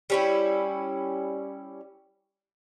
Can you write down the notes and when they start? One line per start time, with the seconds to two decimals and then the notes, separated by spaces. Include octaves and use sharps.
0.10 G3 C#4 E4